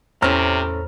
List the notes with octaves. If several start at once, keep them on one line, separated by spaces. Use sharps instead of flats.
E2 A2 C3 C#4 C5 A#5 F6